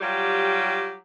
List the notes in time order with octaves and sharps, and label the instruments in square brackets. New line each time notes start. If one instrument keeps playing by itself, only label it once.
[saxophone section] F#3 G3 F4 G4